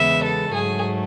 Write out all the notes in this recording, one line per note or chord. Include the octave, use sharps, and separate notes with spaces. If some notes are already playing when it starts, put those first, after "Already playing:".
Already playing: E2 C#3 G#3 B3 E5
A4
G#2 F#3 A3 G#4